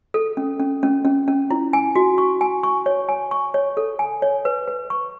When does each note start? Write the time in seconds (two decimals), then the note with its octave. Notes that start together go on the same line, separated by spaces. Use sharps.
0.14 A4
0.37 C#4
0.60 C#4
0.83 C#4
1.05 C#4
1.28 C#4
1.51 E4
1.73 G#5
1.96 F#4
2.18 C#6
2.41 G#5
2.63 C#6
2.86 C#5
3.09 G#5
3.31 C#6
3.54 C#5
3.77 A4
3.99 G#5
4.22 C#5
4.45 B4
4.67 B4
4.90 C#6